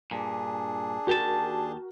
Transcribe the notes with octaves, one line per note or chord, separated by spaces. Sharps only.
G2 A#2 D4 G#4
D#2 F#4 G4 A#4 A5